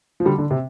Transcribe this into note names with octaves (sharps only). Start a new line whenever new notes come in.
F3
D3 G3
D3
C3